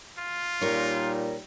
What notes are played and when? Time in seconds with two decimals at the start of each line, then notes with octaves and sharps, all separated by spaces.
0.18 F4
0.61 A#2 G3 D#4 A#4 C#5